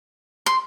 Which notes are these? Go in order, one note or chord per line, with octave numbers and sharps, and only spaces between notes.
C6